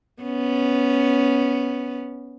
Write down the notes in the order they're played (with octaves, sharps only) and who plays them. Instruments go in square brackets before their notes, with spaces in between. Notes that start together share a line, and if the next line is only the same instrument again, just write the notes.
[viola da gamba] B3 C#4